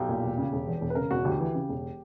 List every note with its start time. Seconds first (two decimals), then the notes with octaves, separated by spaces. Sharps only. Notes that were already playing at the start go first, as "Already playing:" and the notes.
Already playing: B1 G4
0.09 A#2
0.23 E1
0.38 C#3
0.53 E1
0.67 E2
0.81 E1
0.90 B4
0.95 C#3 A#4
1.11 E1 F#4
1.25 D2 G4
1.39 E3
1.55 C#3
1.69 E1